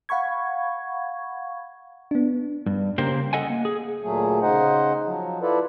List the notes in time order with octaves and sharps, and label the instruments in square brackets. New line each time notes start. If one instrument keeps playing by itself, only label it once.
[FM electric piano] F5 F#5 B5 C#6 G#6
B3 D4
[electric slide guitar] G2
C#3 A#3 G4 A#4 C5
A4 D#5 F#5 G#5
A#3
G#4
[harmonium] D2 A#2 F#3 A3 G#4
C#3 D#4 C5 D#5 F#5
F3 F#3
E4 F4 A4 B4 D5